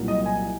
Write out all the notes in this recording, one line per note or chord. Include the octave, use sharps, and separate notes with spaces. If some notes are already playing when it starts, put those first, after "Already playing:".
Already playing: C2 A#2 F#3 A#3
D#5
G#5